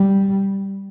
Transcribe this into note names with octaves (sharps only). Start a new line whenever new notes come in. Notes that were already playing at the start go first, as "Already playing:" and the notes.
Already playing: G3